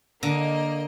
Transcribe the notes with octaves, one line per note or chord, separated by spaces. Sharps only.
D3 A#3 D#5